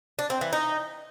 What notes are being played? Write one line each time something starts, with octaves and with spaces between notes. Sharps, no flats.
D4
C4
E3
D#4